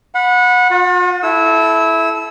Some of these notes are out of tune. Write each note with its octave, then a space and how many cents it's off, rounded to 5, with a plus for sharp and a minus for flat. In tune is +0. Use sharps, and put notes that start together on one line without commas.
F#5 -25 B5 +0
F4 +45 F#5 -25
E4 +0 A4 -25 E6 -25